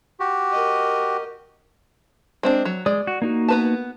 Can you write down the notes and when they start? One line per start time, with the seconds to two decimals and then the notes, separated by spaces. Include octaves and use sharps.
0.20 F#4 G4
0.52 A#4 D#5
2.43 G#3 C4 D4
2.65 F#3
2.86 G#3 D5 D#6
3.07 F#4
3.22 A#3 D#4 F#4
3.49 B3 B4 A5